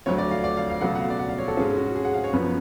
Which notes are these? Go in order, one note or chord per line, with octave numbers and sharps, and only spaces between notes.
D2 D3 F#3 C#5
D5
F5
D5
F5
F5
C#2 B2 F#3 A3 F#5
F#5
F5
D5
F#5
F5
C#5
A4
G#2 G#3 C#4 G#4
F#4
G#4
F#5
F5
C#5
F#2 F3 B3 B4